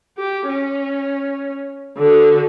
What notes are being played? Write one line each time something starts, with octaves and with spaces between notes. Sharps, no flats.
G4
C#4
D3 F#4